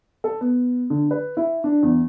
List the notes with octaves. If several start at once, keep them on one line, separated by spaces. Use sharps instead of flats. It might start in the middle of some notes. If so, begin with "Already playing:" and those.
A4
B3
D3
B4
E4
D4
E2